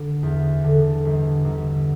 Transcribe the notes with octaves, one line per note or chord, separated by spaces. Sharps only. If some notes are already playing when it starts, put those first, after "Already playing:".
Already playing: D3
E2
D3
G1
G1